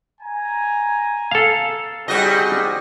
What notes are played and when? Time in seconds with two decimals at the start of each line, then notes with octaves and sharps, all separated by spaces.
0.21 G#5 A#5
1.31 A4 F5
2.08 G3 C4 D#4 F#4 G#4 D#5